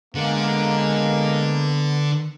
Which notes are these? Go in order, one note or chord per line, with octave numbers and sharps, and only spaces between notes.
D3 G#3 A#3 B3